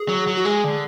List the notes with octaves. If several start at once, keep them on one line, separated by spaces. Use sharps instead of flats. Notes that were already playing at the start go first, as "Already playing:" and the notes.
Already playing: G#4
F#3
F#3
F#4
G#3 G#4
D3